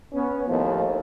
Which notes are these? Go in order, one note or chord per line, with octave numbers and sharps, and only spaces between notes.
B3 C#4
D#2 A2 F3